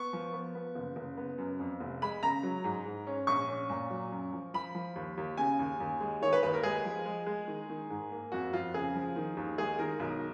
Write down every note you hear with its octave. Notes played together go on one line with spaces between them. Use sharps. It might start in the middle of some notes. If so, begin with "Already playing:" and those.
Already playing: B3 C#6
F3
B3
B3
F#1
F#1
B3
F#2
F2
F1
G#3 B5
C#3 A#5
F#3
G#2
G#2
C#4
A#1 C#6
C#4
A#2
F#3
F#2
F3
F3 B5
F3
D#2
D#2
C#3 G#5
D#2
D#2
G#3
D#3 C#5
B4
D#2 B4
A#4
G#3 G#4
F3
G#3
G#3
D#3
D#3
G#2
A#3
F2 F#4
F2 F4
C#3 G#4
F3
D#3
D#2
G#3 G#4
D#3 A#4
B1